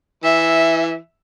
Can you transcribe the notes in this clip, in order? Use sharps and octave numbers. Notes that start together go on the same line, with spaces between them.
E3 E5